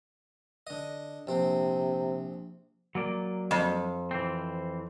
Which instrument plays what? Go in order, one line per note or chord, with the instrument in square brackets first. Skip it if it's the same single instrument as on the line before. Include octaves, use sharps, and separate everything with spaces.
[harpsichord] D3 D#5
[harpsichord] A#1 C4 [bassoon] C3
[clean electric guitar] F#3 A#3 D5
[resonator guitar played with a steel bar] F2
[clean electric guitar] E3 C4